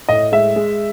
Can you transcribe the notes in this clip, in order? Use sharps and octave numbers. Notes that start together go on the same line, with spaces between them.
A2 D#5
G#3 E5
G#3